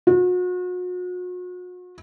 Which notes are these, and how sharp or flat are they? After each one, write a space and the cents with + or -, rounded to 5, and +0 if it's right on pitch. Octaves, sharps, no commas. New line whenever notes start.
F#4 -40